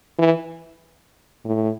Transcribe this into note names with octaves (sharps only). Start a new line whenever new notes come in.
E3
A2